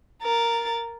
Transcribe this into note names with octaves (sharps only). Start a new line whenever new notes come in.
A#4 A6